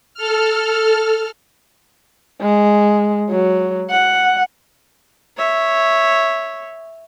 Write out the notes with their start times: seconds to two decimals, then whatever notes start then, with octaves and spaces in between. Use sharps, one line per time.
0.14 A4 F6
2.41 G#3
3.30 F#3
3.90 F#5
5.37 C#5 E5